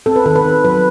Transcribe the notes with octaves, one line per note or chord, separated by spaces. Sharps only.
C4 A4
B4
D#3 A4
B4
D#3
F#3 B4